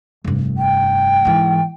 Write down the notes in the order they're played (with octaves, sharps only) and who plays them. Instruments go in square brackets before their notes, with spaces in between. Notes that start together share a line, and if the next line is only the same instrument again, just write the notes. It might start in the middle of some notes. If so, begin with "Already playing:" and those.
[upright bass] F1 G2
[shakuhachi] G5
[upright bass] G#2 E3